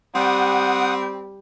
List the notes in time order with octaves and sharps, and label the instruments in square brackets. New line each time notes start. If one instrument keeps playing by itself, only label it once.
[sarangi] G3 [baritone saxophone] C4 [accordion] F#5 D#6